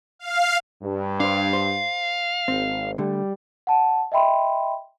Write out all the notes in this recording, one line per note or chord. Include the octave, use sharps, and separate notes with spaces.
F5
G2
D4 C5 F5
C5
G#1 C4
D3 G3 A3
F#5 A5
D#5 E5 G5 B5 C6